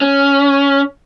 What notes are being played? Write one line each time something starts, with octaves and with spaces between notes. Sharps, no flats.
C#4